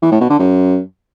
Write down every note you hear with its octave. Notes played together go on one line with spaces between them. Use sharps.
E3
A2
B2
D3
F#2